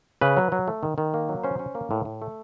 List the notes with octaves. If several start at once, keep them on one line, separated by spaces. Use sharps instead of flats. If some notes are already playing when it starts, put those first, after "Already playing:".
C#3 B4
F#3
F#3
A3
D#3
D#3
A#3
F#3
C#4 C5
C#4
A#3
A2
A2
A3